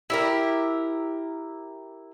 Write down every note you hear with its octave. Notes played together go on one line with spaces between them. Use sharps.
E4 G4 A#4